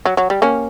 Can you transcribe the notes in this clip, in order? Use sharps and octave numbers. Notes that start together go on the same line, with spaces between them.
F#3
F#3
G3
A#3 C#4